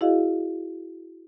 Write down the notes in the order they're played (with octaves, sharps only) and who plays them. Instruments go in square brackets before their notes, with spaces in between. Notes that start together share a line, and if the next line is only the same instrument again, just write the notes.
[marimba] E4 F#4 G#4 D#5 F5